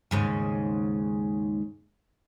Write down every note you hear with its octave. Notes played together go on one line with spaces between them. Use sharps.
D#2 G#2 C#3